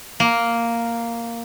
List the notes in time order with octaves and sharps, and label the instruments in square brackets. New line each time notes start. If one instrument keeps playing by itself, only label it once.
[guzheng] A#3